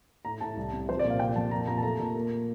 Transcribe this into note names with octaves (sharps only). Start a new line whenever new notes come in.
A2 A#5
A2 A5
C2
C3
F3 C5
D5
A#2
F5
C3 G5
F2 A5
A#2 A#5
A#2 A#5
A5
A3 A#5
A#2
A#3